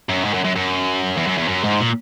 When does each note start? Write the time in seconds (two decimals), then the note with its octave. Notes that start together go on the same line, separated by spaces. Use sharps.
0.09 F#2
0.24 G#2
0.34 F#2
0.44 F#2
0.56 F#2
1.18 E2
1.27 F#2
1.38 E2
1.48 F#2
1.64 G#2
1.80 A#2